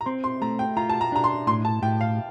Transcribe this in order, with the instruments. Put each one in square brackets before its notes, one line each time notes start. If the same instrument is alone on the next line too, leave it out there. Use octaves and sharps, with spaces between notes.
[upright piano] A#5
[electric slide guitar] C4 [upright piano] C6
[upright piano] C6
[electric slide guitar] A3 [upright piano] A#5
[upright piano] G5
[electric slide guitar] F4 [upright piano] A#5
[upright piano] A5
A#5
[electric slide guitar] D4 [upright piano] A#5
[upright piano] C6
[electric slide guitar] A2 [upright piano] C6
[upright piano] A5
[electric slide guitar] A2 [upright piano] G5
[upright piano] F5